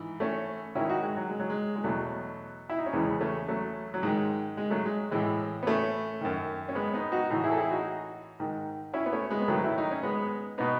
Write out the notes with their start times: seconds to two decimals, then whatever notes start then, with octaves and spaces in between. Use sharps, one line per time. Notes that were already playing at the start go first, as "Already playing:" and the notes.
Already playing: G#2 E3
0.20 A3 C#4
0.75 G#2 D#3 C#4 E4
0.89 D#4 F#4
1.03 G#3
1.17 F#3
1.30 G#3
1.40 F#3
1.50 G#3
1.76 G#3
1.84 E2 B2 F#3 A3
2.69 E4
2.78 D#4
2.86 C#4
2.93 E2 C#3 E3 G#3 B3
3.21 A3 C#4
3.48 F#3 A3
3.94 F#3
4.03 G#2 D#3 G#3
4.57 G#3
4.70 F#3 A3
4.85 G#3
5.11 A2 E3 G#3
5.63 B3
5.67 A3 C#4
6.21 F#2 D#3
6.69 C#4
6.75 G#3 B3
6.94 B3 D#4
7.12 D#4 F#4
7.30 A2 E3 D#4 F#4
7.44 E4 G#4
7.51 A4
7.57 E4 G#4
7.71 D#4 F#4
8.40 G#2 D#3
8.93 C#4 E4
9.06 B3
9.13 A3 C#4
9.30 G#3 B3
9.41 B3
9.48 G#2 D#3 F#3 A3
9.64 E4
9.78 D#4
9.91 C#4
10.03 G#3 B3
10.58 B2 B3 D#4